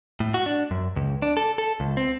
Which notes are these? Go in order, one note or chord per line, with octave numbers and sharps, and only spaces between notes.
A2
F#4
D4
F#2
C#2
D4
A4
A4
C#2
C4